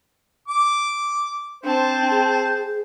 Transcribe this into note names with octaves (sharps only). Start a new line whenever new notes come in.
D6
C4 D4 C5 A5
G#4